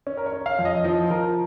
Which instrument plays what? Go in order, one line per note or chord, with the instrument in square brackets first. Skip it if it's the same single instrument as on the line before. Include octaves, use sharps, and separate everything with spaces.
[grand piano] C#4
A#4
C#5
C#4
F5
F2
D#5
F3 D#5
F3 A#4